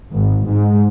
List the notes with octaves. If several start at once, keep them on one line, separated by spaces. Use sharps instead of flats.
G#1
G#2